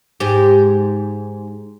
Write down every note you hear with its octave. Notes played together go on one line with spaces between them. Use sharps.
G#2 G4